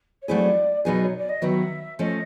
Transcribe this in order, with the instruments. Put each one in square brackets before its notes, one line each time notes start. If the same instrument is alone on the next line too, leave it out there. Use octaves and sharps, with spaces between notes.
[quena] C#5
[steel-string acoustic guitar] F#3 A3 C4 E4 G#4 [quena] D5
[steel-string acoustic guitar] B2 F#3 B3 D#4 G#4 [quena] D#5
[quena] C#5
D5
D#5
[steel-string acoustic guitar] D#3 F#3 B3 [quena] E5
[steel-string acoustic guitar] F3 A3 C#4 [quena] D#5